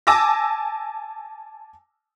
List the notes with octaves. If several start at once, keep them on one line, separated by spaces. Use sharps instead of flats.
G#5 A5 D6 E6 A#6